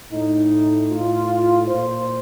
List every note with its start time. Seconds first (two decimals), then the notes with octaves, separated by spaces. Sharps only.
0.12 A2 D#4
0.91 A2 F4
1.68 A#2 C5